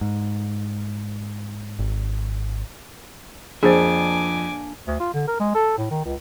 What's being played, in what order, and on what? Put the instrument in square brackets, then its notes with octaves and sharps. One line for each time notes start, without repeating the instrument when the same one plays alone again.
[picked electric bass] G#2
G#1
[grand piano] F2 [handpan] A#3 D4 [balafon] G#4 C5 [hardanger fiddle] G#5 D6
[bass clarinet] D2
F4
D3
A#4
G#3
A4
A2
D#3
C#2